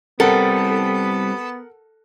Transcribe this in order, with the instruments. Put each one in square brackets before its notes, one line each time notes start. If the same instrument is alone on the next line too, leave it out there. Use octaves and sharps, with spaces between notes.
[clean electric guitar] G3 C4 [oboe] B3 [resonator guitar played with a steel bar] A4 [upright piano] A#4 F#5